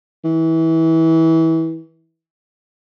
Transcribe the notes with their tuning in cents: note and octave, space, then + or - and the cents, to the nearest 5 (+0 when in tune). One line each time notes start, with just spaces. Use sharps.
E3 -25